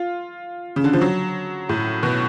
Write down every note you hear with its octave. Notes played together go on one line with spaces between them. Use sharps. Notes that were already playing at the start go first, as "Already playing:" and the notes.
Already playing: F4
C#3
D3
F3
F#3
A2
B2